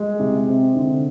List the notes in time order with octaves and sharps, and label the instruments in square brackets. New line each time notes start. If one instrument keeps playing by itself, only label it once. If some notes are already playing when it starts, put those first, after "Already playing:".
Already playing: [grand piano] G#3
C3
C4
D3